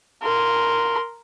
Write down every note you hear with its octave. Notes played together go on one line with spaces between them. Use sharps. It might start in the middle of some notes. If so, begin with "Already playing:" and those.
A#4 C6